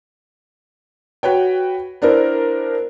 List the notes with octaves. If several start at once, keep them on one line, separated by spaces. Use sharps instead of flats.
F#4 B4 C#5 G5
B3 D4 E4 A#4 C5